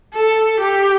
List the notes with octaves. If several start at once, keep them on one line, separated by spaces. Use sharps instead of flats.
A4
G4